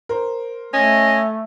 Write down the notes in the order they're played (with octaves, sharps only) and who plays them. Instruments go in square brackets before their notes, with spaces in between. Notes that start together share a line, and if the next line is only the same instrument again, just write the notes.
[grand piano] A#4 C5
[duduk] A3 [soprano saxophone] C#4 [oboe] D#5